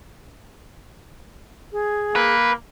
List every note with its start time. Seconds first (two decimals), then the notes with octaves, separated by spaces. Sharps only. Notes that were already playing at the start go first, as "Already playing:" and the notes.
1.72 G#4
2.16 A#3 B4